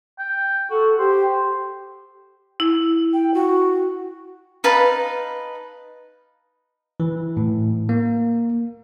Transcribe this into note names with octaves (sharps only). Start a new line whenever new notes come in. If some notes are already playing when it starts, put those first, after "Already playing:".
G5
F#4 A4
G4 C5
E4
G5
F#4
D#4 B4 F5 A5
E3
A2
A#3